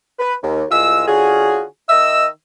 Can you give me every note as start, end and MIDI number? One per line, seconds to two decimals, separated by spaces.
0.19 0.34 71
0.42 0.63 39
0.71 1.03 36
0.71 1.03 56
0.71 1.03 65
0.71 1.03 88
1.06 1.64 50
1.06 1.64 61
1.06 1.64 65
1.06 1.64 66
1.06 1.64 68
1.89 2.26 51
1.89 2.26 75
1.89 2.26 76
1.89 2.26 88